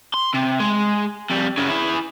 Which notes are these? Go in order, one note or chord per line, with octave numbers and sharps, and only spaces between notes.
C6
C3
G#3
F2 G3
F#2 C#3
E4 G#4